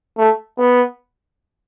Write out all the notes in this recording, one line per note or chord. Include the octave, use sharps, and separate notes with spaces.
A3
B3